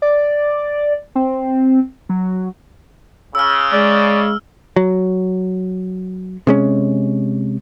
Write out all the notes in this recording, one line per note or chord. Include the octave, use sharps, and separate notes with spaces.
D5
C4
F#3
C#3 E6 F6
G#3 D5
F#3
C3 G#3 C#4